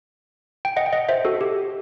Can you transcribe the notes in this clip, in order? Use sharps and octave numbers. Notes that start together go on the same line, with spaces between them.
G5
D#5 F#5
G5
D#5 F#5
C5 E5
F#4 A4
G4